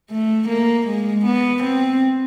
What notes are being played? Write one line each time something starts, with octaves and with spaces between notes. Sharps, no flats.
A3
A#3
G#3
B3
C4